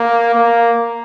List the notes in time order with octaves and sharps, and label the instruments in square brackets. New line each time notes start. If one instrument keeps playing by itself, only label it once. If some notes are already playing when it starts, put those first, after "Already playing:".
Already playing: [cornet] A#3
A#3